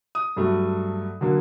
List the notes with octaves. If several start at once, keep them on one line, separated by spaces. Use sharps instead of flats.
D#6
G2 F#3 A3
D3 F#3 A#3